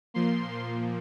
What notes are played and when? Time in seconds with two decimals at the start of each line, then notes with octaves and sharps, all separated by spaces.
0.14 A#2 F3 A#3 C6